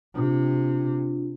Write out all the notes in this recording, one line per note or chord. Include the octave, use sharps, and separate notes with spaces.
C3 D4 F4